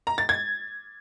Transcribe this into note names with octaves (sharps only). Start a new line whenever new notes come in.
A#5
A6
G#6